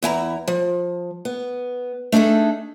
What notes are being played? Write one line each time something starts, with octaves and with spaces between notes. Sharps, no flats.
E2 E4 G#5 A#5
F3
B3
A3 D4 D#4 G#4 A4